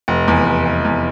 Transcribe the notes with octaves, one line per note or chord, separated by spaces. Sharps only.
F1
E2
F1
F1
E2